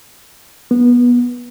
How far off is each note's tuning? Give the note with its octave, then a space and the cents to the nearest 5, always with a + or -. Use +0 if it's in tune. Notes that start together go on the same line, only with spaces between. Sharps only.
B3 -20